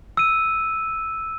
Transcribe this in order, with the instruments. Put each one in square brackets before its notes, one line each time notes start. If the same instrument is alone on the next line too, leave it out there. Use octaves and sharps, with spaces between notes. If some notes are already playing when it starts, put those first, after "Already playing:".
[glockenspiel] E6 D#7